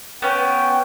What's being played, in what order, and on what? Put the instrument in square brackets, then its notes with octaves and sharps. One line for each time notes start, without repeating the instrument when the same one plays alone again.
[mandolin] B3 C#4 [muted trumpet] G5